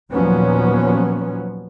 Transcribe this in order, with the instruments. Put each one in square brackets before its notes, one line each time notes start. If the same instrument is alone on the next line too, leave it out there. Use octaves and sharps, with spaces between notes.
[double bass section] D#2 A#2 F3 F#3 B3 C#4